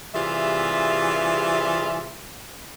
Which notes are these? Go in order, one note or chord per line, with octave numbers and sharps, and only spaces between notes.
C3 E3 G3 F4 G#4 E5